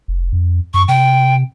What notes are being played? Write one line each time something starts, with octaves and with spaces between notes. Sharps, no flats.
F1
F2
F#2 C#6
C3 G5